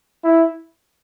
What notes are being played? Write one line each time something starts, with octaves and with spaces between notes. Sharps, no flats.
E4